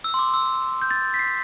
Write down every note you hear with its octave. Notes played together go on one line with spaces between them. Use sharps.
E6
C6
D6
E6
G6
A6
B6
C7